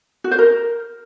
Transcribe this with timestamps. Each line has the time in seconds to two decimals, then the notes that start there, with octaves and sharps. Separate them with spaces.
0.24 F#4
0.31 C5
0.39 A#4